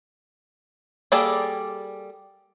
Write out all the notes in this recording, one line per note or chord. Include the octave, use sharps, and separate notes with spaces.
G3 A#3 G#4 A4 D5